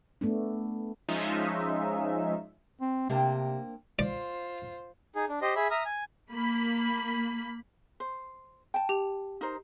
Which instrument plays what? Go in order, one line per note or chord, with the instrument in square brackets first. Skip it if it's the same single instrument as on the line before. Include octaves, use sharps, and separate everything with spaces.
[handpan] A3 B3 D4
[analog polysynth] F3 G#3 C#4 D#4 F4 E5
[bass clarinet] C4
[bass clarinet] C3 [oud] A#3 C4 D4
[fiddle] F4 C5 [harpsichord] D5
[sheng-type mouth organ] D#4 G#4
D4
G4 C5 D#5
G#4 E5 B5
E5 A#5 D#6 F6
G#5
[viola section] A#3 B5
[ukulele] C5
G5 A5
[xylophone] G4 F7
[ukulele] D#4 A#4 C5